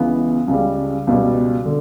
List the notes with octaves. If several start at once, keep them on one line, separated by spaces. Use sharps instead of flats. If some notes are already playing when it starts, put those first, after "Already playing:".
Already playing: C#2 C#3 E3 B3
C#2 C#3 G3
C#2 B2 G3
D3